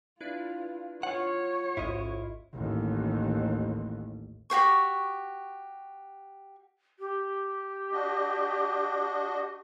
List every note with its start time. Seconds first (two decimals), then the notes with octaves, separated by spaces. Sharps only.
0.20 D4 E4 F4 B4
1.03 F4 C#5 F#5
1.77 A1 D2 G#2 E4 F4 D#5
2.53 A1 D#2
4.50 F#4 G4 C5 C#6
6.99 G4
7.93 D4 F#4 D#5